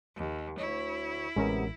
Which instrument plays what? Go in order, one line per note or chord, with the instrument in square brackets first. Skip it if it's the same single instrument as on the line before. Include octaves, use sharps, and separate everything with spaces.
[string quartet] D#2
[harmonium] D2 C#5 [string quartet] E4
[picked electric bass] A1 [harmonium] C3 B3 [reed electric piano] G#3 C#4 A#4